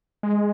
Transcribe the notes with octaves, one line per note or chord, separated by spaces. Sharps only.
G#3